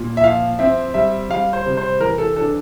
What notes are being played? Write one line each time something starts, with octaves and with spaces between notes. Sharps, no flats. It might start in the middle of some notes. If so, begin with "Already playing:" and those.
Already playing: A#2
E5
F3 F5
C4 E5
G3 E5
G3 F5
C5
C3
C5
E3 A#4
A4
D4 A4